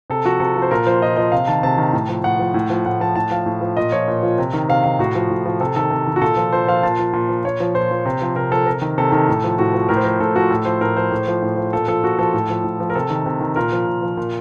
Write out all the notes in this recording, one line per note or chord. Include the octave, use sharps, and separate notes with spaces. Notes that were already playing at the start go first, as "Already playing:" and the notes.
C3 A4
F3 F#4
C3 A4
F3
C5
A#2 A#4
F3 C5
A#2 D#5
F3 D#5
C3 F5
D#3 A5
C3 A5
D#3
A2
F3
A2 F#5
F3
A2
F3
A2 F#5
F3 A5
A2 A5
F3 F5
A2
F3
A#2 D#5
F3 C#5
A#2
F3
C3
D#3
C3 F5
D#3 F5
A2 F#4
F3
A2
F3
C3 A4
D#3 A4
C3
D#3
F#4
A#2 A4
F3
A#2 C5
F3 F5
A#2 A5
F3
A#2
F3
A#2 C#5
F3
A#2 C5
F3
C3
F3
C3 A#4
F3 A4
C3 A#4
D#3
C3 A4
D#3 A4
A2
F3
A2 F#4
F3
A2 A#4
C5
F3 A#4
A2 A4
F3 F#4
A2 A4
F3 C5
A2 A#4
F3 C5
A2
F3
A2
F3
A#2 A4
F3 A4
A#2 F#4
F3 A4
A2
F3
A2
F3
A#4
C3 A4
D#3
C3
D#3
A#2 A#4
F3
A#2
F3
A#2